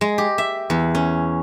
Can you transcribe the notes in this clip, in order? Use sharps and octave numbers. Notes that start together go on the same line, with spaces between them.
G#3
G4
E5
E2
C#4